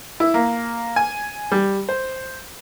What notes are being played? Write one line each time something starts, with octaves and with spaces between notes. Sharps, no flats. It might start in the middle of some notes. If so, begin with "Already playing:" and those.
E4
A#3
G#5
G3
C5